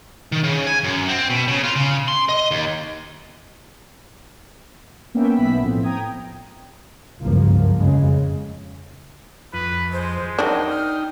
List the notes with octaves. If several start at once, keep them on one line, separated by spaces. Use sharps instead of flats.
D#3
C#3
G#5
F#2
C4
B2
C#3
F4
C#3
C6
D#5
D#2
A#3 B3 C#4 E5 G5
B1 B3 E5 B5 B6
A2 F3 C4
G5 A#5 D#6 G#6
F#1 C#2 G2 F3 A#3
F2 C#3 G#3
F2 B4
G#3 C5
F#3 D4 D#4 A#4 G5
F6